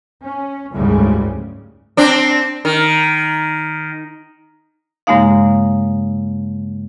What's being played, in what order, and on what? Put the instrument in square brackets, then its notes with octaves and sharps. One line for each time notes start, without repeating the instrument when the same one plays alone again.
[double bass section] C#4
F#1 D2 G#2 C#3 G3
[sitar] C4 D4
D#3
[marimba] G2 C#3 G#3 A#3 D#4 F5